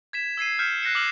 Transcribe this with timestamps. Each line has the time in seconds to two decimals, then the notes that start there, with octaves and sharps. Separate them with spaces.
0.13 G#6 B6 E7
0.37 E6 G#6 C7 D#7
0.59 F6 G6 B6 C#7 E7
0.82 F#6 A#6 C7 C#7 E7
0.95 D6 E6 F6 C7 E7 F#7